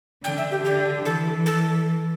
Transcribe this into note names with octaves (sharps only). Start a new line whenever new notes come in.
D3 G5
E5
G4
D3 G4
E3 A4
A4